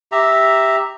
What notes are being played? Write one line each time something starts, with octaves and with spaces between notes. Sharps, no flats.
G4 E5 A#5